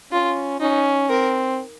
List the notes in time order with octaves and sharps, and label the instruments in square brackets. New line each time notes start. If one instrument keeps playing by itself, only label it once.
[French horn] C#4 [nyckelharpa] F4
[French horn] C#4 [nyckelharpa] D#4
[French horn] C4 [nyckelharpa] A#4